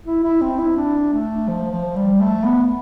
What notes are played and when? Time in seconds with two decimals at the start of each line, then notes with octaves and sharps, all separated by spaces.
0.06 E4
0.24 E4
0.41 C4
0.59 E4
0.76 D4
1.13 A3
1.48 F3
1.72 F3
1.96 G3
2.20 A3
2.44 B3